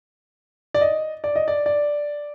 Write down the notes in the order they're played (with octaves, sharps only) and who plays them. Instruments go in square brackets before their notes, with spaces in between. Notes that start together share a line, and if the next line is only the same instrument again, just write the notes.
[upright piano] D5
D#5
D5
D#5
D5
D5